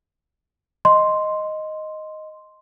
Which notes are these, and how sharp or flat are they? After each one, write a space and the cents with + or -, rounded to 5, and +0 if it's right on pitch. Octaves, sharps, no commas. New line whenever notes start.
D#5 +0 C6 +0